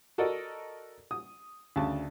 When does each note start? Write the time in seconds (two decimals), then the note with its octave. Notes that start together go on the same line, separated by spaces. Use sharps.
0.18 F#4 A4 A#4 D5 D#5
1.11 D#6
1.76 D2 C#3 A5